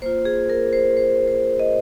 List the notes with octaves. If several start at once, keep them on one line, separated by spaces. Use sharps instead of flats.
A#3 F4 C5
G#4
A#4
C5
C5
C5
D#5